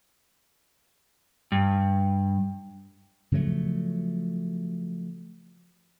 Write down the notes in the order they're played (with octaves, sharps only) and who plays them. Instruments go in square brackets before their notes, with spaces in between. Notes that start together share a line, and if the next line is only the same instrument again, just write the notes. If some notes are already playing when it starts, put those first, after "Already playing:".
[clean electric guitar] G2
[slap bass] C#3 F3 F#3 A3